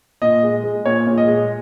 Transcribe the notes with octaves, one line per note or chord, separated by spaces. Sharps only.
A#2 D#5
G#3
G#3
A#2 C#5
A#2
D#5
G#3